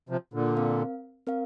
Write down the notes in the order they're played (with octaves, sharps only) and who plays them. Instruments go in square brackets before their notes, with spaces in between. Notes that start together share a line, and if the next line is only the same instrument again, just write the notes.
[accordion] C3 F3
A#2 D3
[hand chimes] C4 A#4 F5
C4 A#4 F5